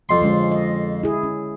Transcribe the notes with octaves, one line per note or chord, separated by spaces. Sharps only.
F2 C6
D3 G#3 C#4
D#5
E4 G#4
C#4